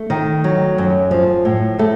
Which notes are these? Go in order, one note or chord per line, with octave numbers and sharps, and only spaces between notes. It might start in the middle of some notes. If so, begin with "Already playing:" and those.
Already playing: A3
D#3
F#3
F#2
F3
A2
A2 A3